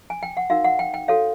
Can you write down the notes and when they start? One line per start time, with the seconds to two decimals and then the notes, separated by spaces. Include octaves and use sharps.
0.10 G#5
0.23 G5
0.37 F#5
0.50 D#4 F#4 A#4 F5
0.64 F#5
0.79 G5
0.94 G5
1.08 F#4 A4 C#5 F5